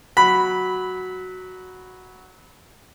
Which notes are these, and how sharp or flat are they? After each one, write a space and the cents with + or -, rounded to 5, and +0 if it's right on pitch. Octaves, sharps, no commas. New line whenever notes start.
F#3 +0 B5 +0